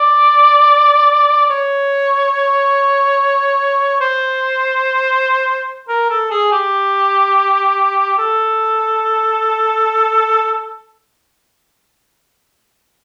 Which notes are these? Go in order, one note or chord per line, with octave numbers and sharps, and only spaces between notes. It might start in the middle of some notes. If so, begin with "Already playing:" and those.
Already playing: D5
C#5
C5
A#4
A4
G#4
G4
A4